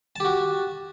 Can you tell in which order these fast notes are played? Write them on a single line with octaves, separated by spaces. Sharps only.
A5 G4 F#4